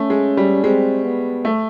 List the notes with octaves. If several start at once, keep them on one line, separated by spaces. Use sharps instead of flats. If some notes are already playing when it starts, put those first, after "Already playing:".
Already playing: A3 C#4
G#3
G3
G#3 C4
B3
A3